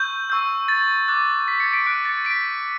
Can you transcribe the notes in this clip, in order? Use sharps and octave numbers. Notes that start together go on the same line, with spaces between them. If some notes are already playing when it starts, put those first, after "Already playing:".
Already playing: C#6 E6 G6
C#6 E6 G6
A6
D6 F#6 A6
B6
A6 C#7
B6 D7
C#6 F#6 B6 D7
A6 C#7
B6 D7